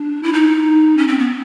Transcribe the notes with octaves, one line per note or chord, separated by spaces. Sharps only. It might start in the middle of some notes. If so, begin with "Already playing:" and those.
Already playing: D4
E4
D#4
C#4
C4
B3